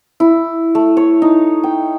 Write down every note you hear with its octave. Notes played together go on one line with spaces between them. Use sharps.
E4
A3
C#5
D#4
G5